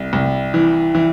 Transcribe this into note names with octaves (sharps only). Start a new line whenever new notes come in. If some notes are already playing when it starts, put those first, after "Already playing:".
Already playing: C2
C2
E3
E3